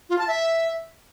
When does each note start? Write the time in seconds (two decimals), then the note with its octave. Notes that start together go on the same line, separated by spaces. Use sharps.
0.10 F4
0.19 A5
0.28 E5